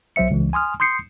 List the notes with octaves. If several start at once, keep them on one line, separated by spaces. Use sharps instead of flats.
B1 F#3 C5 E5 C#7
C#2 E3
G#5 C6 D#6 F6
C6 D#6 G6 C7 C#7